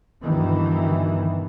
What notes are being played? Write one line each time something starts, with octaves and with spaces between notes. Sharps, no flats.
D2 G2 B2 D#3 E3